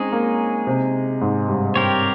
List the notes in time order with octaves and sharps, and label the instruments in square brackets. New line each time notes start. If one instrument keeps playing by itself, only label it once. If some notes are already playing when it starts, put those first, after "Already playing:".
Already playing: [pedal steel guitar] G#3 D#4 G#4 [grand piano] C4 C#4
[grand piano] A#3
C3
G#2
G2
[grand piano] G2 [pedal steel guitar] C4 G4 A#4 C#5